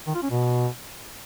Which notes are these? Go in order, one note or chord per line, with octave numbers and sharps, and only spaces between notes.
D#3
F4
C#4
B2